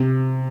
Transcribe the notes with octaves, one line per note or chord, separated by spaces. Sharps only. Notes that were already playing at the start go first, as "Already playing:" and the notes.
Already playing: C3